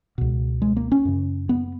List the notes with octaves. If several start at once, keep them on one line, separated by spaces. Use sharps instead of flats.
C#2 B2
G#3
A#3
C#4
F#2 C#3
B3